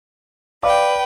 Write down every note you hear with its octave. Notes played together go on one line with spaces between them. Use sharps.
B4 D5 F5 G5 D6